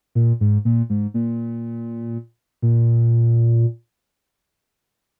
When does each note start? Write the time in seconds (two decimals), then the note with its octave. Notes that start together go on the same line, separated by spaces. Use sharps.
0.15 A#2
0.41 G#2
0.65 A#2
0.90 G#2
1.14 A#2
2.62 A#2